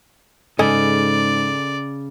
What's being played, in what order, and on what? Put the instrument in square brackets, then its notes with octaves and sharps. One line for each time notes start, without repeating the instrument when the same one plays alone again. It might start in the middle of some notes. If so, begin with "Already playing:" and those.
[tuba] G#2 [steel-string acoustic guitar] C#3 [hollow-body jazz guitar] A4 D#5 G#5 [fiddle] D5